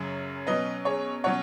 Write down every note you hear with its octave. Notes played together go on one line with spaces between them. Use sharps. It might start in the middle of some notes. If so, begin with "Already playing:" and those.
Already playing: F#2 C#3 F#3 C#4
B2 F#3 C#4 B4 D#5
G#4 C#5
B2 F#3 C#4 C#5 F#5